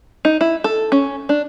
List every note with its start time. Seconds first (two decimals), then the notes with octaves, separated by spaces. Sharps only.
0.25 D#4
0.41 E4
0.64 A4
0.92 C#4
1.29 D4